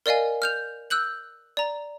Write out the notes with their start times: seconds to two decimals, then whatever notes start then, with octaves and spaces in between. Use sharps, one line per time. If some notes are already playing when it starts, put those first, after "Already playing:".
0.06 A#4 D5 D#5 F5 G#5
0.42 F6 G6 F7
0.90 E6 F#6 G6 F#7
1.57 D5 A#5